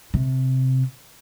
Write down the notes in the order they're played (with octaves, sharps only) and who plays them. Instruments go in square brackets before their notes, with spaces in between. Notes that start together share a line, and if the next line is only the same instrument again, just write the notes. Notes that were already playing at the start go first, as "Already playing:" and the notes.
[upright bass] C3